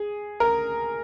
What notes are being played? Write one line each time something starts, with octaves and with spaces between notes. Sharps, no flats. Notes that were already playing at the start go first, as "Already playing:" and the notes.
Already playing: G#4
A#4